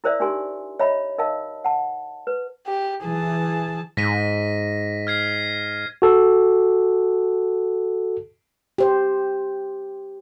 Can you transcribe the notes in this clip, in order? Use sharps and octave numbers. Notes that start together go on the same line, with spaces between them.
E4 A#4 C5 D5 E5
D4 D#4 G4 A#4 G#5 C6
C#5 D#5 E5 A#5 B5
D#4 A#4 D#5 F5 A5
F#5 A5
B4
G4
E3 G#4 A5
G#2 A#6 B6 D#7
F6 G#6 C7
F#4 A4
G4 C5